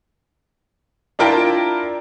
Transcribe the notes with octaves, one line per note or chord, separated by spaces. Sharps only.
D4 E4 F4 A#4 G5 A5